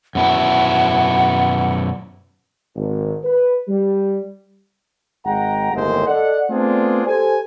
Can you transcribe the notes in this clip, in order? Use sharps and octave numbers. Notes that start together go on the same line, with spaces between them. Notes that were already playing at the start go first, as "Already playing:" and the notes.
F#2 B2 E4 F#5
G#1
B4
G3
G#1 G#3 F#5 G5 A#5
G1 D#2 A2 G#3 C4 C5
A4 D5 D#5 F#5
A3 B3 C4 D4 F4 G#4
G4 A4 C5 G#5